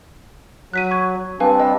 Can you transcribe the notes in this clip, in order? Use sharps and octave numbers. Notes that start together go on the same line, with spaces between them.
F#3 F#6 B6 D#7
C#6 G#6
G3 C4 D4 B4 F5 G#5
D#5 A5